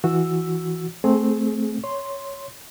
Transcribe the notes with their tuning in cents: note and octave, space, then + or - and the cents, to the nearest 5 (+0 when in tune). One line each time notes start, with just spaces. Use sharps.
E3 +0 F#4 -10 E6 +0
A3 +0 C4 +0 G#4 +25
C#5 +5 C6 +0